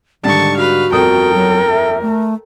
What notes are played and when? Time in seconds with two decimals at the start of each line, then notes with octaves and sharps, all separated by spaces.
0.23 G#2 D3 D#3 G3 A5 C#6
0.57 F#4 B4 F5
0.92 G1 F2 A4 A#4 G5 D#6
1.34 F#3
1.70 E5
2.02 A3